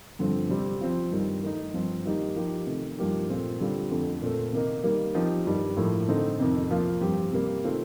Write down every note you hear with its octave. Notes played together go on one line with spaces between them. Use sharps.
G2 D3 F3 C4
C3 G3 C4
F3 C4 F4
G2 D#3 G3
D#3 A3 D#4
G2 F3 C4
D#3 G3 A#3 D#4 G4
F3 A#3 D#4 G4
C3 D#3 A3
G2 F3 A#3 D#4 G4
A#2 A3 C4 F4
D3 G3 C4 F4
F2 D3 A3
A#2 A3 C4
C3 D#3 A#3 D#4
D#3 G3 A#3
F3 C4 D#4 G4
G2 D#3 G3
A2 F3 A#3
D3 A3 C4 D#4
F2 C3 D#3
C3 F3 A#3 F4
G2 F3 C4 G4
C3 G3 A#3
C3 D#3 A3 C4 F4